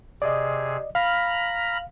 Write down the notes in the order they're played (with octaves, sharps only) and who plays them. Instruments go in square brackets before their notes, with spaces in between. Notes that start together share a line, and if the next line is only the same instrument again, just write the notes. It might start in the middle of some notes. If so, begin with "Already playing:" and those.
[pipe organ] C3 G#4 [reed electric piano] D5 D#5
[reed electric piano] F5 [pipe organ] A#5 B5 F6